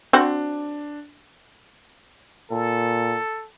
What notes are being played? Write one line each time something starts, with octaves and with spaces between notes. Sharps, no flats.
C4 D4 F#4 C5
A#2 A4